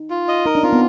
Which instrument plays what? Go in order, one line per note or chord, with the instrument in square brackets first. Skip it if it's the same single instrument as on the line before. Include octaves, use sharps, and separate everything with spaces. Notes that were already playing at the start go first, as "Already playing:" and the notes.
Already playing: [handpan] D#4
[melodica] F4
D#5
[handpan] D#4 [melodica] A#4
[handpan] D4
[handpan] C4 [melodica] F4
[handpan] B3